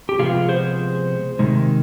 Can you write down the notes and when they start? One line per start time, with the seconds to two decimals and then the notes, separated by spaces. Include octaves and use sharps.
0.09 G4
0.19 C3 F3 G#3 B3 F4 G#4
0.49 G#4 C5
1.39 C3 D#3 G#3